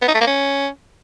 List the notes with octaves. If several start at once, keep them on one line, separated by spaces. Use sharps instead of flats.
B3
D#4
A3
A#3
C#4